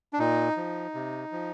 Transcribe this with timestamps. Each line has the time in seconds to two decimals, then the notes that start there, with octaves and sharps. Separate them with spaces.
0.13 D4
0.19 A#2 D#4
0.57 F3
0.94 C3
1.32 F3